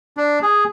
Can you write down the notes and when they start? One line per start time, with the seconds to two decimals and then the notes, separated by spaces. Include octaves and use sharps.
0.17 D4
0.42 G#4